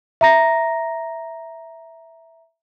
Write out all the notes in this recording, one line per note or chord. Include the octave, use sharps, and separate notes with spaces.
E5 A#5 A#6